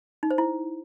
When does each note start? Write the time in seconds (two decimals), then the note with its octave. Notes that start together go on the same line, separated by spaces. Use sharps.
0.23 D#4
0.31 C5
0.38 E4